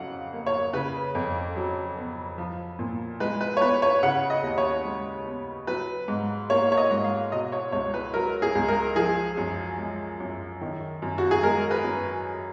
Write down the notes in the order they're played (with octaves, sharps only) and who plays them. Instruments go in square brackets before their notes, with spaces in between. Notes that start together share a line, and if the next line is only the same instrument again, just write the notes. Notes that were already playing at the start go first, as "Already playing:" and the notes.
Already playing: [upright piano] F2 C#3 F#3 F5 F#5
A#3
C#5
C#3 B4
F2
F#3
B3
F3
A#2
G#3 B4
B4
C#5
B3 B4
C#5
C#3 F#5
D#5
D#2
C#5
G#3
B3
F#3 B4
G#2
A#3 C#5
C#5
D#5
G#2
F5
B2 D#5
C#5
C#2 C#5
B4
F#3 A#4
G#4
C#2
A#4
F3 G#4
F#2
G#3
F#2
D#3
F#2
F#4
G#4
G#3 A#4
B4
F#2